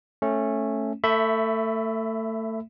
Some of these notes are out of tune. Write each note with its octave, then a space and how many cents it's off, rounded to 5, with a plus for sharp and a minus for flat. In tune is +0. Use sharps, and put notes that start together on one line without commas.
A3 +0 C#4 -10
A3 +25 E5 +0 B5 +20